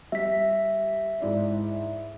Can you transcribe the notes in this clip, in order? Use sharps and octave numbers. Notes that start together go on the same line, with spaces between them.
G3 E5 B6
G#2 E4 D5